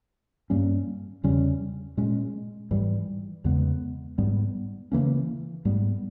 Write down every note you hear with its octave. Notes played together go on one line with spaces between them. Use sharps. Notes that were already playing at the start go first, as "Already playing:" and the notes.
G2 G3 A#3 C#4
E2 C#3 G3 C#4
A#2 G#3 C#4
G#2 E3 G3
E2 C#3 G#3 B3
G#2 G3 B3
C#3 E3 A#3 C#4
G#2 G3 B3